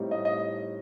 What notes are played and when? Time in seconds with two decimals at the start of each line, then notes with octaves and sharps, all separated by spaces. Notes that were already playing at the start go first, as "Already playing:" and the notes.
Already playing: A2 G3 C4 D#4
0.11 D#5
0.25 D#5